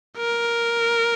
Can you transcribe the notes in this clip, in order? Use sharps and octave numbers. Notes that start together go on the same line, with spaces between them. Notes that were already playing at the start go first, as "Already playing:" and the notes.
A#4